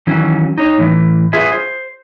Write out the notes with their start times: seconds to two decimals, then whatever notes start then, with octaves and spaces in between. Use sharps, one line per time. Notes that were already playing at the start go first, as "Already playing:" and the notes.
0.07 D#3 E3 F#3 C#4
0.58 D#4 C#5
0.78 A2 E3
1.33 F4 G#4 B4 E5
1.52 C5